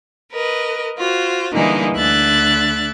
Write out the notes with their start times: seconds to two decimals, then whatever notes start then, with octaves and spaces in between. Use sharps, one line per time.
0.31 A#4 B4 D#5
0.98 F4 F#4 C5
1.53 D3 E3 G3 G#3 A#3 D#4
1.94 D2 D3 E5 F#6 A6